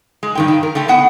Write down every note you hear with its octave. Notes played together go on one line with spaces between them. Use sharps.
G#3
G2 D#3 G5
D#3
A#4
D3 A3 G5
A2 B3 F#5